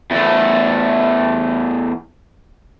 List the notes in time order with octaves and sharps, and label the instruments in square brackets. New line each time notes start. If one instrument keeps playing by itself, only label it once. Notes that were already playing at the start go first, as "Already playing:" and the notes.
[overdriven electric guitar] E2 A3